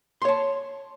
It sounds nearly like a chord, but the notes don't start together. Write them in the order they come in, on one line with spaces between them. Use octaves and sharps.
C6 C#5 A5